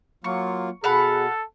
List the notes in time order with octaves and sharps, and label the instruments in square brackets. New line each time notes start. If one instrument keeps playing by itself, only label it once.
[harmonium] F#3 A#3 F4 [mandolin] C#6
[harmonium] B2 [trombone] G#4 [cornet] A4 [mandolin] F5 F#5 B5